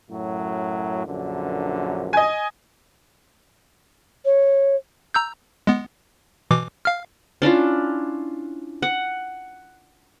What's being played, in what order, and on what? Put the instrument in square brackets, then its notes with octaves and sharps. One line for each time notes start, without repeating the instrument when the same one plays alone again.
[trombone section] F#2 A2 F#3
A#1 F#2 D3
[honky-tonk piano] D#5 G#5
[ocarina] C#5
[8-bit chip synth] A#5 E6 G6
G#3 B3
B2 E3 D6
F5 F6
[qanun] C#4 D4 E4 F4
F#5